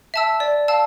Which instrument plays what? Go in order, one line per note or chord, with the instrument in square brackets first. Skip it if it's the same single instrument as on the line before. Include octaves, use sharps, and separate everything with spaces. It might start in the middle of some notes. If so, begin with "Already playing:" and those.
[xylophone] E5 A5 E6
D5
F5 A5 E6